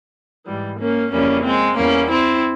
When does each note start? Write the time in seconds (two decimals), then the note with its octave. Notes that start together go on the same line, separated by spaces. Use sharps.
0.47 G#2 E3 G3
0.79 A#3 C#4
1.12 F2 C#3 E3 G3 A#3 C#4
1.44 G#3 C4
1.77 E2 E3 G3 A#3 C#4
2.10 C4 E4